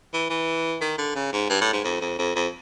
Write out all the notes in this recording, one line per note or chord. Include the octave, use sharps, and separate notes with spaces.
E3
E3
D#3
D3
C#3
G#2
G2
A2
G#2
F2
F2
F2
F2